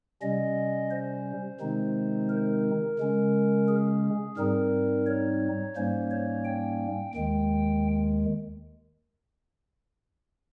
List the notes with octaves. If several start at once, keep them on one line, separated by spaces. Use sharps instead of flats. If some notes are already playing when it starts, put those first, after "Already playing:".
C3 G3 C#4 D#5
C5
C3 D#3 G#3 C4 D#4
A#4
C#3 G#3 C#4
G#4
G#2 G3 C4 D#4 A#4
C#5
G#2 G3 A#3 C#4 C5
C#5
G5
D#2 D#3 G#3 G5